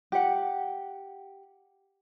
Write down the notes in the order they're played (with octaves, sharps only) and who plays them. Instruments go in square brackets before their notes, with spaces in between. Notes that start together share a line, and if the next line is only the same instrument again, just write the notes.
[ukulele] G4 F#5